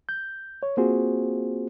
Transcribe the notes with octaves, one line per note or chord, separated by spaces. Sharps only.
G6
C#5
A#3 C4 F4 F#4 G#4 C5